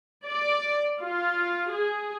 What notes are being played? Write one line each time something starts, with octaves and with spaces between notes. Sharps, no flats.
D5
F4
G#4